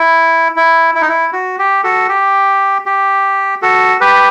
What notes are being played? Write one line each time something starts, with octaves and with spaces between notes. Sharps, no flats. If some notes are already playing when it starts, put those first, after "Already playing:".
Already playing: E4
E4
E4
D#4
E4
F#4
G4
F#4 A4
G4
G4
F#4 A4
G4 B4